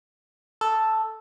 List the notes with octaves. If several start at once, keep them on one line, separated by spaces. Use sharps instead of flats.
A4